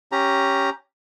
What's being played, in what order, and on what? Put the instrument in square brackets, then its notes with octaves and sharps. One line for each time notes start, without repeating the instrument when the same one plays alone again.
[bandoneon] C#4 G4 A#5